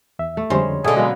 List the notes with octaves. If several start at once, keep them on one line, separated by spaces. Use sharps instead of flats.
E2 E5
A3
F2 D3 G3 G#3 C#4 C5
B2 D3 G#4 A4 E5 G#5
F#3 G#3 A#3 B3